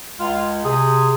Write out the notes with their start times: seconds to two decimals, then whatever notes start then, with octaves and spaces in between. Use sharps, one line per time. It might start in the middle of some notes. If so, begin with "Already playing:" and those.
0.19 C#2 F4
0.65 C3 G#4